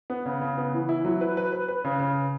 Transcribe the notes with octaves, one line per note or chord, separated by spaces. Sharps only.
B3
C#3
C#3
B3
E3
E4
F#3
B4
B4
B4
B4
C#3
C#3